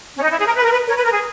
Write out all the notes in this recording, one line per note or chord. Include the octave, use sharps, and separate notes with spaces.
C#4
D#4
E4
G#4
A#4
B4
A#4
B4
A#4 C#5
B4
A#4
G#4